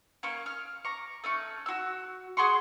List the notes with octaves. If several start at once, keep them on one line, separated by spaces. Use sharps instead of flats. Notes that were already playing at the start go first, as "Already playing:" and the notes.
A#3 C#4 C#6
F6
A#5 C#6 D6
A3 C#4 C#6
F#4 E6
G#4 F#5 C6 C#6